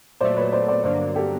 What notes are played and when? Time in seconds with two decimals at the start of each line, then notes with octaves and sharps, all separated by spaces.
0.21 A#2 F#3 A3 C5 D5
0.37 B4 C#5
0.53 C5 D5
0.68 C5 D5
0.84 G2 D3 F#3 A#3 C5 D5
1.15 G4 A4